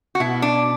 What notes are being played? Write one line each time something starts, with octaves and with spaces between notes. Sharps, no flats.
F#4
B2 E4
D4